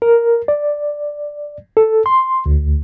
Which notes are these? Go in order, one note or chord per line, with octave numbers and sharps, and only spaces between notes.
A#4
D5
A4
C6
D2